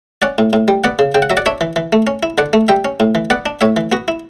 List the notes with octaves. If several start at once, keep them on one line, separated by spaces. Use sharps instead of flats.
C#4 D5 F#5
A2
A2
G3
B3 D5 F#5
C#3
C#3 G5
F#5
F#3 E5
D5 F#5
D4 C#5 E5
E3
E3
A3
C#4
E4
D3 D5 F#5
A3
G3 E5 G5
C#4
A2
E3
B3 D5 F#5
D4
A2 C#5 E5
E3
B3 F#4
E4